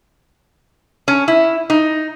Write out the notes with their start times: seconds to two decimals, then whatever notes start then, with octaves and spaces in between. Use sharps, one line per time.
1.08 C#4
1.28 E4
1.70 D#4